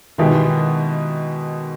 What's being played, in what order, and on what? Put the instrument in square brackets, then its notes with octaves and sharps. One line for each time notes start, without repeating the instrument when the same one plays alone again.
[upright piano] B2 G#3 B3 E4 G4 [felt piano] D#3